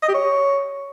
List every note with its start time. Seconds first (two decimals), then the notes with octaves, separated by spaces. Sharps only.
0.03 D#5
0.08 G4
0.14 C#5